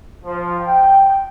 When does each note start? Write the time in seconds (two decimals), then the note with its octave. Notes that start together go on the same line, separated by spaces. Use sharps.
0.24 F3
0.60 G5